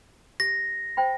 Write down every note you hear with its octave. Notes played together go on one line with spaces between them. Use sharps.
G4 A#6
C5 G5 B5